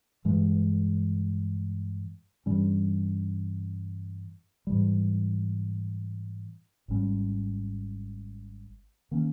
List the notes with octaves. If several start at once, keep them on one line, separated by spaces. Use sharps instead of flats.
G2 E3 G#3
G2 E3 G3 C#4
G#2 E3 G3
G#1 G#2 G3 C#4
D#3 A#3 C#4